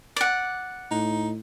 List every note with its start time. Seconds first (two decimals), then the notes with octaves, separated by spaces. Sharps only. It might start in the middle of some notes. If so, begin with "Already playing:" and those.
0.16 D5 F#5
0.91 A2 D#4